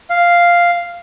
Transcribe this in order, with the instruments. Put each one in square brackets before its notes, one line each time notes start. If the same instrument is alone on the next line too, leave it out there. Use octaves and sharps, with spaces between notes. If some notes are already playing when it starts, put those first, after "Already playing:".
[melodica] F5